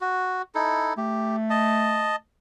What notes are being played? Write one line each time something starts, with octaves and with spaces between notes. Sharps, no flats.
F#4
D#4 E4 A4
A3 G4
D#5 A5